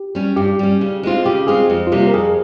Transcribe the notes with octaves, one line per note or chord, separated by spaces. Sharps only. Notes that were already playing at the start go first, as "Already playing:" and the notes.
Already playing: G4
G3 C#4
G2 G4
G3 C#4
C#3
G#3 C4 F4
C#3 G4
G#3 C4 F4 G#4
F2
F4
C3 G3 A#3 G4
A#4
F2 G#4